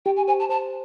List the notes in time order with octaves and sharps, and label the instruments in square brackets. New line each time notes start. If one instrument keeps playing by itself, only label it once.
[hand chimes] G4 [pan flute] G5
[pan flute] G#5
[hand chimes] C5 [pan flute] G#5
[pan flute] A5
[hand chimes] C5 [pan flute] A5